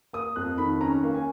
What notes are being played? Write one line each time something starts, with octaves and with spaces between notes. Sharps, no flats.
A#3 D#6
F2 F#6
D#3 B5
C#4 A#5
A#3
G#5